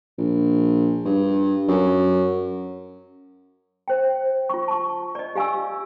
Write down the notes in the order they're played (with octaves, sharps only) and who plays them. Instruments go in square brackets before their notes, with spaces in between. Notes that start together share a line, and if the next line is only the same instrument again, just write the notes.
[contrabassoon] A#1
G2
F#2
[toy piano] C5 G5
F4 C#6
A5 C#6
D5 D#5
G4 F5 G#5 C#6 E6